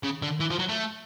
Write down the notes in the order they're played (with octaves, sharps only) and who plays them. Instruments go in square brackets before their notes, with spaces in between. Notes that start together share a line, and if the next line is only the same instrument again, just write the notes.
[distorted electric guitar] C#3
D3
E3
F3
F#3
A3